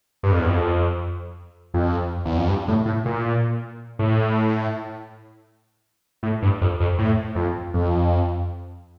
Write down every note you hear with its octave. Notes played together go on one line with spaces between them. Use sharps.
G2
F2
E2
F2
F2
E2
F2
G2
A2
A2
A#2
A2
A2
G2
F2
F2
A2
F2
F2